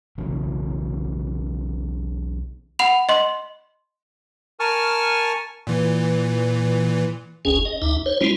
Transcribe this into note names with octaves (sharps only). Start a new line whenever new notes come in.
B1 C#3 E3
F#5 B5 F7
D#5 C6
A#4 G#5 A5 C#6 F6
A#2 E3
G1 C#2 C#4 G#4
D#5
D2 D#4 E5
C5 C#5
G3 G#3 C#4 E4 F4